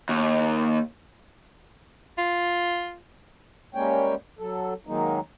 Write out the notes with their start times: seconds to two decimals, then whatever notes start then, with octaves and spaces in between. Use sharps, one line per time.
0.09 D#2
2.18 F4
3.75 G3 G#3 A#3 C#4 C#5 G5
4.39 F#3 A4
4.87 D#3 F#3 G#3 A#3 D#4